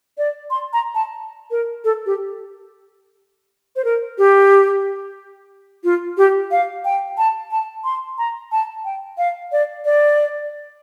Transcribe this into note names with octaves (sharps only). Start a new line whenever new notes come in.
D5
C6
A#5
A5
A#4
A4
G4
C5
A#4
G4
F4
G4
F5
G5
A5
A5
C6
A#5
A5
G5
F5
D5
D5